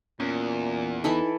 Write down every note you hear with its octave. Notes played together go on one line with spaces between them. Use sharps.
E2 A#2 C#4
E3 D#4 E4 A4